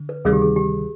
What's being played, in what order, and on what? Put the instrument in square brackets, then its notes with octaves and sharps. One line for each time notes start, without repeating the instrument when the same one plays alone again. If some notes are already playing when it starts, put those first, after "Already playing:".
Already playing: [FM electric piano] D3
[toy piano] B4
[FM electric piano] D2 C3 D#3 G3 [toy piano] G#4
[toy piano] G4
G#4
G4